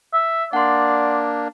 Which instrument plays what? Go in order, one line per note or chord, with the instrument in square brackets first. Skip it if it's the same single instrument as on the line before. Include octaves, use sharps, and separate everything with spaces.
[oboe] E5
[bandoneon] A#3 D4 [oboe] D5 [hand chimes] F#5 C6